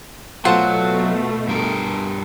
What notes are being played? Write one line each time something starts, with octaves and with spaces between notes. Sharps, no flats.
B2 F#3 A3 F4 C5 F#5 A5
G2 A#4